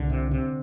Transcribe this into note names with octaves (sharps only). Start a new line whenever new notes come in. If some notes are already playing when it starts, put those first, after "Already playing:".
Already playing: C2 D3
C3
C3